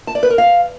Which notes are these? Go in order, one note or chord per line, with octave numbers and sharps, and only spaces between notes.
A5
D5
B4
A#4
F5